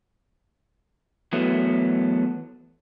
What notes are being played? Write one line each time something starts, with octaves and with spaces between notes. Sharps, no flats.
E3 F#3 A3 B3